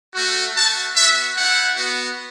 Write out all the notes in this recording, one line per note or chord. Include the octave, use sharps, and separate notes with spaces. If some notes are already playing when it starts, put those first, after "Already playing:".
A3 F#4
A3 F#4 A5
B3 F#4 E5
A3 E4 F#5
B3 F#4